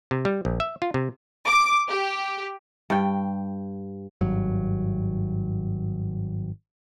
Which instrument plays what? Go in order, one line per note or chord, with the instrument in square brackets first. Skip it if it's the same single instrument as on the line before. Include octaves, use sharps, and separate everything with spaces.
[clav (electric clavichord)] C3
G3
A#1
E5
F4
C3
[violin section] D6
G4
[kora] G2 G5
[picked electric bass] G#1 G2 F#3